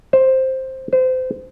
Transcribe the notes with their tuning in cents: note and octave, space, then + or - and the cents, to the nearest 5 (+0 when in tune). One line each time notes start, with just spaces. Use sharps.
C5 +5
C5 -30